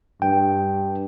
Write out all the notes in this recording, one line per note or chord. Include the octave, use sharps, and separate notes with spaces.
G2 G5